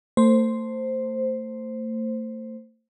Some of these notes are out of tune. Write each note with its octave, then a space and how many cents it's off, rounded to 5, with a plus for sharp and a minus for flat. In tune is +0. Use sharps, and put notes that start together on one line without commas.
A3 +40 C5 +0